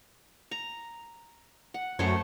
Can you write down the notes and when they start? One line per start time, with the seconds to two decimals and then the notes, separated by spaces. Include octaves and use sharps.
0.51 A#5
1.74 F#5
1.99 F#2 A3 C5 C#5